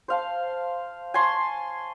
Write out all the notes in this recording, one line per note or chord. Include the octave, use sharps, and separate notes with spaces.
C5 F5 A5
G#5 A5 C6 C#6